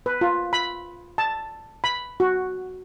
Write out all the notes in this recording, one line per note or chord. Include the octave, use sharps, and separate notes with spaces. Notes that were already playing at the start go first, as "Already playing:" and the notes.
B4
F4
B5
A5
B5
F#4